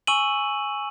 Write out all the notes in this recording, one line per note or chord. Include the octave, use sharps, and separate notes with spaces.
G#5 C#6 E6 D#7 F#7